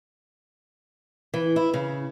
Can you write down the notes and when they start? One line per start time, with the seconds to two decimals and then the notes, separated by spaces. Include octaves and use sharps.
1.34 E3
1.56 E4
1.74 C#3